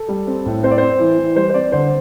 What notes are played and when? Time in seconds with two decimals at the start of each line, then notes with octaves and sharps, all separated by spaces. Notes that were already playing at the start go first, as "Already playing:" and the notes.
Already playing: A4
0.08 G3
0.27 C4
0.46 A2
0.63 C4 C5
0.71 D5
0.78 C4 C5
0.99 E3
1.18 E3
1.36 G3 C5
1.49 C5
1.54 C4 D5
1.72 D3 C5